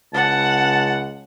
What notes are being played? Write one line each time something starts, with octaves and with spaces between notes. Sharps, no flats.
C#2 F#5 A5